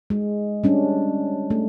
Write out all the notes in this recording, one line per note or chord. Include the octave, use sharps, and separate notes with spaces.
G#3
G3 C#4 D4
A3